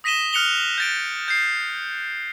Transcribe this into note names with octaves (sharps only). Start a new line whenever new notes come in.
D#6 A#6 B6 D#7 E7 G7
F6 F#6 C#7 F7 G7
G6 A6 D7
G6 C7